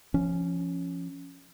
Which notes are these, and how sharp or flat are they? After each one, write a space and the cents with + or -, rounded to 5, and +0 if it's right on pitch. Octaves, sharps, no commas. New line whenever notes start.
F3 -20 C#4 +0